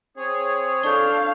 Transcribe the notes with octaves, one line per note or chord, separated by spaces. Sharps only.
C4 G#4 C#5
D4 A4 F5 C#6 G6